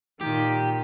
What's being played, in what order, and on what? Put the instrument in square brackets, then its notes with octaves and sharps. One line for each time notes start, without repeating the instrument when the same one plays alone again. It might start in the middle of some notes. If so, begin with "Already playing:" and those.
[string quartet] A#2 D#3 [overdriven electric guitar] G4